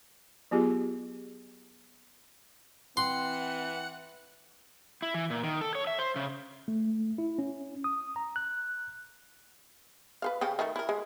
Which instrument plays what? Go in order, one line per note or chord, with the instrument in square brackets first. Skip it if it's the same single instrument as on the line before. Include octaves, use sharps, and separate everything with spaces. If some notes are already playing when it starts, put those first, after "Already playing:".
[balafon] F#3 B3 F4 G4 G#4
[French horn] E3 [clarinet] C4 [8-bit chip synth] F#5 F#6 C#7 [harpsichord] C6
[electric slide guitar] E4
E3
A#2
D#3
A4
C#5
E5
C5
C#3
[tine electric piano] A3
E4
C#4
D#6
A#5
F#6
[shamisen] B4 C5 F5
C#3 G4 G5
D#3 A3
E4 A#4
G#3